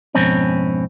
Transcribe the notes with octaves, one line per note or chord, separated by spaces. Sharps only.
F2 G#2 B2 C4 C#4